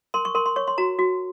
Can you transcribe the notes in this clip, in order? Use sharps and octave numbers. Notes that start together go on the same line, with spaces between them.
A#4 C6
C#6
A#4 C6
C6
C#5 C#6
C6
F#4 A#5
F#4